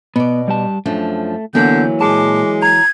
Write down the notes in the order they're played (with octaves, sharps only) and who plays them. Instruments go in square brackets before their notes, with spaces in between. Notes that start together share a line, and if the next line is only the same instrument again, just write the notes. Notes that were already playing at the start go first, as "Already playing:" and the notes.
[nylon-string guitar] B2 D5 [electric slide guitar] B3
[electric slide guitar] G3 G4 A5
[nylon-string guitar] F#2 F3 D4 [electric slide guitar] A3
[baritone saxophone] D3 [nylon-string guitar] E3 F#3 A#3 [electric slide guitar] B3 [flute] G6
[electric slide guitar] A#2 A5 [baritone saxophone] G#3 [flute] D6
[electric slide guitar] A#5 [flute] G#6